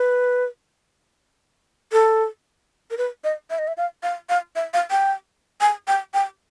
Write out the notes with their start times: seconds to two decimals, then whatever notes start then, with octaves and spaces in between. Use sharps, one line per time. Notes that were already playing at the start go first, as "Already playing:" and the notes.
Already playing: B4
1.92 A4
2.91 A#4
2.98 B4
3.24 D#5
3.50 E5
3.59 D#5
3.68 E5
3.77 F5
4.03 F5
4.29 F5
4.56 E5
4.74 F5
4.91 G5
5.61 G#5
5.88 G5
6.14 G5